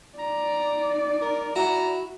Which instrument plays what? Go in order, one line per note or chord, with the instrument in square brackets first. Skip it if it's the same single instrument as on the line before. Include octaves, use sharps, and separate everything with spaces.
[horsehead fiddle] D#4 D5 [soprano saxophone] A#5
[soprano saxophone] A#4
[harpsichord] E4 F#4 [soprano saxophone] A#5